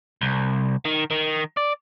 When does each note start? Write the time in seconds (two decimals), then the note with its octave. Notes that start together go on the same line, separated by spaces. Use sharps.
0.21 C2
0.85 D#3
1.11 D#3
1.57 D5